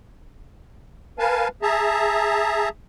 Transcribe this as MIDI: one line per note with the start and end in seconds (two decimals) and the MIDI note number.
1.19 1.48 70
1.19 1.48 71
1.19 1.48 77
1.19 1.48 80
1.19 1.48 81
1.62 2.69 68
1.62 2.69 76
1.62 2.69 81
1.62 2.69 82